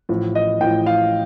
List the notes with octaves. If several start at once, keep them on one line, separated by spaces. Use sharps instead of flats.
A1 A2 F3
D#5
A1 A2 F3 G5
F5